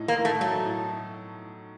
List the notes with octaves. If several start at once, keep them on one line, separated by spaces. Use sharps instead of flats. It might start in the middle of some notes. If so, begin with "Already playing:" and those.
Already playing: A2 D#4
A#3
A2
A3
F#3 A3
A2